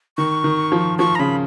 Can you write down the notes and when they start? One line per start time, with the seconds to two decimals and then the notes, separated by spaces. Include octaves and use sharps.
0.17 D#3 C#6
0.44 D#3
0.72 F3
0.99 F3 C#6
1.15 A#5
1.19 C#3 B5